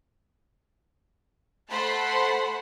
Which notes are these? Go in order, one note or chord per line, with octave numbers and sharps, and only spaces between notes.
A3 C5 F#5 A5 B5 C6